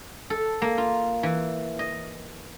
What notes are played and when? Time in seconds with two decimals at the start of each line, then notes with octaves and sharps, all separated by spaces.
0.30 A4
0.62 A#3
0.78 F4
1.23 E3
1.79 D#5